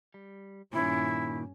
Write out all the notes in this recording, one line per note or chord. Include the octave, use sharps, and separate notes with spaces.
G3
G2 A#2 D#3 C#4 E4